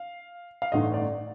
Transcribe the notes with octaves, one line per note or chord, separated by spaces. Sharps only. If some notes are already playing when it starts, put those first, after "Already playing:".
Already playing: F5
F5
A1 G2 D3 A3 D#4 D#5
D5